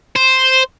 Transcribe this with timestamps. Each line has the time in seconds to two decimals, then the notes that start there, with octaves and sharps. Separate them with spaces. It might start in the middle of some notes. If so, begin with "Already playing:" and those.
0.16 C5